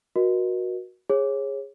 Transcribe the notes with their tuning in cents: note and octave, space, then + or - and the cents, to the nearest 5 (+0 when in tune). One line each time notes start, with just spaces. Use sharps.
F#4 -5 A#4 +40 D#5 +0
G#4 -15 C#5 -20